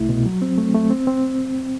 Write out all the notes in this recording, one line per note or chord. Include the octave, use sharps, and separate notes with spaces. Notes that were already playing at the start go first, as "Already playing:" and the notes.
Already playing: C2 A3 E4
B2
F#3
C4
A3
A3
C4
C4